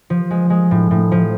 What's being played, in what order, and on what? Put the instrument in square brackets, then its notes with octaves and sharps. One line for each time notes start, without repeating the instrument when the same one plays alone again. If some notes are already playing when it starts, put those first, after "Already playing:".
[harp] F3
G#3
G#3
A2
A2
F3